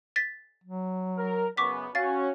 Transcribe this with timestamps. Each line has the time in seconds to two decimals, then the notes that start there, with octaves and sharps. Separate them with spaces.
0.16 A6 B6
0.64 F#3
1.18 A#4
1.57 F#2 C#3 B3 C#6 D6 B6
1.95 C#4 F#4 F5 A6